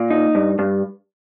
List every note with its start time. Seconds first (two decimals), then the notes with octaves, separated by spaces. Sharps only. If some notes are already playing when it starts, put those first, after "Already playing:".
Already playing: A#2
0.10 D#4
0.35 G2
0.59 G2